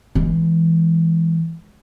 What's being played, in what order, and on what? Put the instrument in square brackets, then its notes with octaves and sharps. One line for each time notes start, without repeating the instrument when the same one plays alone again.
[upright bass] E3 G#3